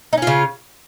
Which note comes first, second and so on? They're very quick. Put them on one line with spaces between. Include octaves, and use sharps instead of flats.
D#4 C#4 F4 C#3